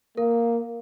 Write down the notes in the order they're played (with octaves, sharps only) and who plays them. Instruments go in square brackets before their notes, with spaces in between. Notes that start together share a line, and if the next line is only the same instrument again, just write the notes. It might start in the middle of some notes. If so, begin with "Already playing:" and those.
[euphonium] A#3 [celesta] A#4